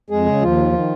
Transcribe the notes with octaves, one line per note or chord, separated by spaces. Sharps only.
F2 G#3 G#4
C#3
D#2 F3 F4
D#3
D#3